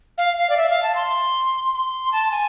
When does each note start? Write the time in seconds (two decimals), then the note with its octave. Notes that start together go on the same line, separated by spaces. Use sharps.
0.18 F5
0.37 F5
0.49 D5
0.57 E5
0.69 F5
0.82 A5
0.95 C6
1.73 C6
2.12 A5
2.31 G#5